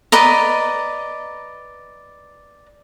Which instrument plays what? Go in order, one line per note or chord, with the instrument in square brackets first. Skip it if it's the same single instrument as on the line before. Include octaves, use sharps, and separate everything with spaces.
[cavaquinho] B4 D5 D#5 A#5